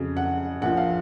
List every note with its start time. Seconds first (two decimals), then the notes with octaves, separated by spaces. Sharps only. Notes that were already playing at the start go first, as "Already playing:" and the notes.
Already playing: F2 C#3 F#3
0.17 F#5
0.61 A#1 A#2 F3 F#5
0.77 F5